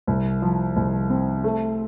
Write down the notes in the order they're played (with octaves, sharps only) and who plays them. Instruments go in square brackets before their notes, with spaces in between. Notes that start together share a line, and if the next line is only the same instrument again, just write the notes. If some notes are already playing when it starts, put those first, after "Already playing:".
[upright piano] C2
F3
C2
C4
A3